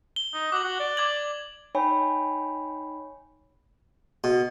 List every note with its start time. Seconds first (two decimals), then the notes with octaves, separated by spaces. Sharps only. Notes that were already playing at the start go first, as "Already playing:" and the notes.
0.16 G7
0.34 D#4
0.52 F#4 D6 F#7
0.64 F#4
0.80 D5
0.97 D6 G#6 F#7
1.75 D#4 C#5 G5 G#5 B5
4.24 B2